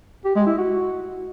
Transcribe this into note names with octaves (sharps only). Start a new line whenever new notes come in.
G4
G#3
E4
F#4